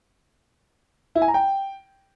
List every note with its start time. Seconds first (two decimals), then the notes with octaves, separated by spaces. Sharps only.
1.15 E4
1.22 G#5
1.28 A#5
1.34 G5